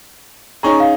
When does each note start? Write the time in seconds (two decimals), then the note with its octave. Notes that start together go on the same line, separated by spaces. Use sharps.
0.63 C#4 D#4 G#4 A#5 C#6
0.80 F5